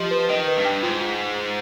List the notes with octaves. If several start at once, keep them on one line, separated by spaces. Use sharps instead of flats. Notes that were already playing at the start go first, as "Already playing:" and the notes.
Already playing: F3 G4 D#5
B4
D#3 D#5
B4
G2
G5
G#2 F4
F4